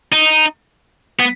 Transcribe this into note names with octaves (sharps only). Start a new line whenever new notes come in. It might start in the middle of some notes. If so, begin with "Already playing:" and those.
D#4
B3